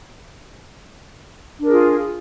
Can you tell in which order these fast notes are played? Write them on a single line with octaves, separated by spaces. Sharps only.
D4 A#4 G#4 F4